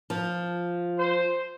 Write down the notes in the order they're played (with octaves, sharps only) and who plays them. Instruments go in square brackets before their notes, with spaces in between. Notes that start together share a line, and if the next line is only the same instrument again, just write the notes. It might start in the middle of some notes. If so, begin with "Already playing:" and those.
[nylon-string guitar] F3
[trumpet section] C5